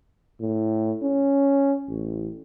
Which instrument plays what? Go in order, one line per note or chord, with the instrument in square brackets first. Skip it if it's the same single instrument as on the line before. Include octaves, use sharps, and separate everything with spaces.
[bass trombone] A2
C#4
A1